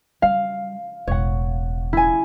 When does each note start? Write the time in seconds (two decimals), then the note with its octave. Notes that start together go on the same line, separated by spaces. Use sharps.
0.22 G3 F5
1.07 E1 A2 C#5 F#5
1.93 E4 G#5